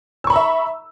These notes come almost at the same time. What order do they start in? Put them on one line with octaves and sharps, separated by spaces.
E6 C#6 B5 A#5 E5